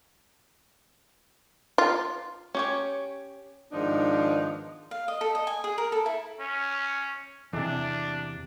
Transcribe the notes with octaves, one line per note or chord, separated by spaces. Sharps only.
F4
C#4 G4 C#5
G#2 D#3 F3 B3 D4 D#4
F5
D#5
A4
D#5
G#5
G#4
A#4
A4
E4
C#4
E2 C3 D4